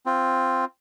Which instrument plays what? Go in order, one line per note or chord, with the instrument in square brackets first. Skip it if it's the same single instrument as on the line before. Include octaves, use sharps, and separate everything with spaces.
[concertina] C4 F4